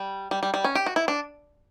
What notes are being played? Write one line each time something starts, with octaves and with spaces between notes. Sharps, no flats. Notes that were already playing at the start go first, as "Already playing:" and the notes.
Already playing: G3
G3
G3
G3
C#4
G4
F#4
E4
D4